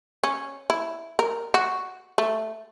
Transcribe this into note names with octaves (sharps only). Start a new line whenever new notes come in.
C#4
E4
A#4
F#4
A3